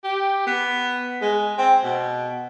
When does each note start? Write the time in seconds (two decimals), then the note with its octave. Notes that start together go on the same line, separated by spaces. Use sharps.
0.04 G4
0.47 B3
1.22 G#3
1.58 C4
1.83 B2